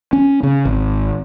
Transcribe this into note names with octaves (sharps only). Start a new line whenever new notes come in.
C#4
C#3
G#1